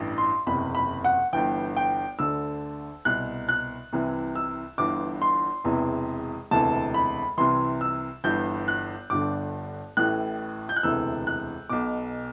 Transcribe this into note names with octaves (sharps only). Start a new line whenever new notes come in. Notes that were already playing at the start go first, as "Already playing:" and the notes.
Already playing: A1 G2 E3
C6
F#1 E2 C3 B5
B5
F#5
G1 G2 E3 G5
G5
D2 D3 E6
C2 B2 F#6
F#6
C2 C3 E3
E6
G1 G2 E3 D6
C6
E1 E2 C3 E3
E1 D2 C3 E3 A5
B5
C2 C3 E3 C6
E6
G1 G2 E3 G6
F#6
G1 G2 D3 D6
A1 A2 E3 F#6
G6
F#6
E1 D2 C3 E3 E6
F#6
B1 B2 D6